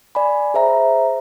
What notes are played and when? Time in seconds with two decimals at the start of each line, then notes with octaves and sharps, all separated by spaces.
0.15 D5 G#5 B5
0.54 G#4 C5 E5 A#5